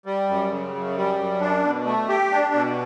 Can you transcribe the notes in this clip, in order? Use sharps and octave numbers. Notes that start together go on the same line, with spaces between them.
G3
F#2
C#3
F#2
G3
F#2
D4
B2
A3
G4
D4
B2